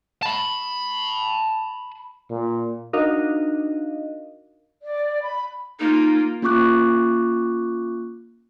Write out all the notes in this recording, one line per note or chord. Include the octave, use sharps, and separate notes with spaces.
A5 B5
A#2
D4 D#4 F#4 A#4 D#5 F5
D5
B5
A#3 D#4 F4
A#3 C#4 F4 C#6 D6 F#6